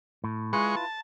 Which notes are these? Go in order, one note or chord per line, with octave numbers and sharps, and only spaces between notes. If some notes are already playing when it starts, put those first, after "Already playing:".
A2
G#3 E4 F4 B4 C#6
A5